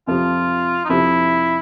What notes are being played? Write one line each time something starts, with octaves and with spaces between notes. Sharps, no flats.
F2 C3 F3 F4
D#4
F2 C3 F3 E4